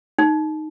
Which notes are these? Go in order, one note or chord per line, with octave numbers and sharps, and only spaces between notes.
D#4